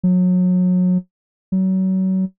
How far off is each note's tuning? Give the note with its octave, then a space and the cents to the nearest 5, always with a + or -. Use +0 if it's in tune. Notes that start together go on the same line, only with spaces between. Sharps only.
F#3 -30
F#3 +30